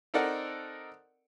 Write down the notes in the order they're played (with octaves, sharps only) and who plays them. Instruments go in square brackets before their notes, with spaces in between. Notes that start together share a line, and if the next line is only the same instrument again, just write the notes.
[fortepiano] C4 D#4 A4 A#4 D5 F#5